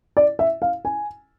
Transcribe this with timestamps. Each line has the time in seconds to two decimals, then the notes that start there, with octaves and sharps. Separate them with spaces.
0.17 D5
0.39 E5
0.62 F5
0.85 G#5